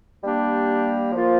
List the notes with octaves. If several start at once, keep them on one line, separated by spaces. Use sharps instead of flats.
G3 A#3 D4 G4
F3 A#3 F4